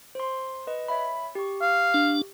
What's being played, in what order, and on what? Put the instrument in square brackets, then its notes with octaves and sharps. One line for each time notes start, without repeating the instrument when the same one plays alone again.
[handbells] C5 C6
B4 D#5
C#5 E5 B5
G4 C#6
[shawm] F5
[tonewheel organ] D4